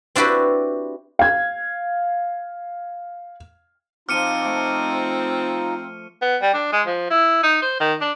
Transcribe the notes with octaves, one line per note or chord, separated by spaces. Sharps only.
C4 D4 E4 F#4 G4 B4
F5 G#6
F3 C4 D#4 F4 D6 F6 C#7 D#7
A3 D6
B3
G3
D4
G#3
F3
E4
D#4
C5
D#3
D4